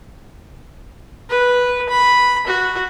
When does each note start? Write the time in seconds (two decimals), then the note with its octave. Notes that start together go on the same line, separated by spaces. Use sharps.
1.29 B4
1.89 B5
2.47 F#4